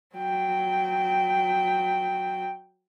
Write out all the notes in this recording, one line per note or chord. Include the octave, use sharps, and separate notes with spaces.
F#3 G5